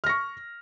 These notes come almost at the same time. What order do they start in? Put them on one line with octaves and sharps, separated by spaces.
F6 A#6 C#6